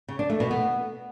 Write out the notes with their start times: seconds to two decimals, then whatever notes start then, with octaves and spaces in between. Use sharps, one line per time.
0.08 C#3
0.19 D4
0.30 A3
0.40 B2
0.51 B3